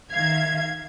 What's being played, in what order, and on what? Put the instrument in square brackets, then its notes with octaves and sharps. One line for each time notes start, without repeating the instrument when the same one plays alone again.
[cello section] D#3 E5 F5 [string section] G#6